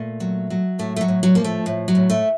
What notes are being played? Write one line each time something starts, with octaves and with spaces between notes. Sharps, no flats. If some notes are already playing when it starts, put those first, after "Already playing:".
Already playing: A#2 A3
F#3
F#3
A2 A3
A3
F#3
A2
F#3
F3 A#3
A3
A2
F#3
A2
A3